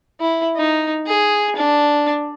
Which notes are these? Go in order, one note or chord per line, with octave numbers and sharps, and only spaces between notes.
E4
D#4
G#4
D4